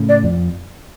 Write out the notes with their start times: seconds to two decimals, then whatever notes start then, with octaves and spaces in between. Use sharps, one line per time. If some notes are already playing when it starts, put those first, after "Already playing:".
Already playing: A2 C#3
0.09 D5
0.24 F2